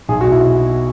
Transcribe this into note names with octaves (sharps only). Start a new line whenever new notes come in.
B1 G#4
F#4
B2
E4
B2